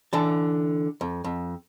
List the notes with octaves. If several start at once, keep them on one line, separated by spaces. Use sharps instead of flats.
D3 E3 A5
F2
F2